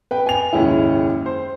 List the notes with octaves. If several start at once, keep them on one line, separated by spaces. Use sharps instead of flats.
B4 G5
G#5 F7
F#1 D#2 G#2 C#4 E4
C5